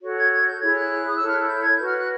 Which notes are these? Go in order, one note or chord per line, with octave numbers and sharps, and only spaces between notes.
F#4 A4 C#5
G#6
G#6
G6
E4 G#4 C#5 G#6
F#6
D#6
E4 A4 C#5 E6
F6
F#6
G6
G#6
F#4 B4 G6
F6
F#6